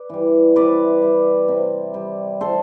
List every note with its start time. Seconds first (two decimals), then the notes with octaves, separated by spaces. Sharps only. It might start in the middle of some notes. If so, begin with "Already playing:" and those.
Already playing: B4 D5
0.09 E3 G3
0.56 C3 B4 D5
1.02 G3
1.48 C3
1.94 G3
2.41 A4 C5